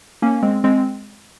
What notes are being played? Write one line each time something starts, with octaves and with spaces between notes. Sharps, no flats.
A#3 C#4
G#3 C4
G#3 C4